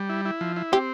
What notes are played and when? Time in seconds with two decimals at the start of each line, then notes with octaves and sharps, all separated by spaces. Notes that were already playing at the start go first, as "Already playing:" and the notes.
Already playing: G3
0.09 E4
0.25 E4
0.41 F3
0.56 E4
0.72 C4 G4